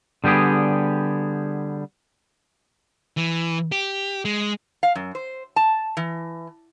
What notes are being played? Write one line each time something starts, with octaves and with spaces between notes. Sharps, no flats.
D3 G3 B3 G4 G#4
E3
G4
G#3
F5
F#2
C5
A5
E3